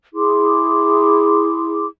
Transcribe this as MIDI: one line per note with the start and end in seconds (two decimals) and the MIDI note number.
0.14 1.86 64
0.14 1.86 68
0.14 1.86 84
0.14 1.86 86